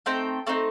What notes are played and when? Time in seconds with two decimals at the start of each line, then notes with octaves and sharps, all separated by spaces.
0.06 A3 C4 D#4 G5
0.47 A3 C4 D#4